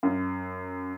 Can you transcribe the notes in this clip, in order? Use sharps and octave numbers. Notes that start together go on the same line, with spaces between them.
F#2